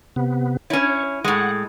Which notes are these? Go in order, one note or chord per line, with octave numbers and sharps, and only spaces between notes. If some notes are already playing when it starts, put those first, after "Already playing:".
C3 B3
C#4 E4 C#5
A2 G#3 F#5